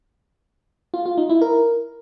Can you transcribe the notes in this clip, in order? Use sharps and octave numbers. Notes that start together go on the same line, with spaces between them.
F4
F4
D#4
E4
A#4